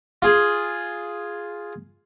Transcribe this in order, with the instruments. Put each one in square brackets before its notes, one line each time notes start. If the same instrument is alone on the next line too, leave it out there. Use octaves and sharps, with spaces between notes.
[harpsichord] F4 G#4